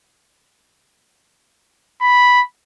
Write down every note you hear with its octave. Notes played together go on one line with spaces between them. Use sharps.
B5